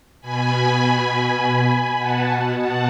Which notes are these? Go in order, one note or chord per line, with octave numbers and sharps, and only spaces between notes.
B2 G#5 B5
B2 F#5 A5
F#5 A5